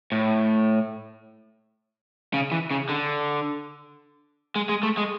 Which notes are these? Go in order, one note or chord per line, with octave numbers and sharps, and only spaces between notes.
A2
C#3
E3
C#3
D3
G#3
G#3
A3
G#3